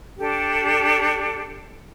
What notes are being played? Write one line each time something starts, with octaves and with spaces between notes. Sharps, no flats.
D4 G4 A4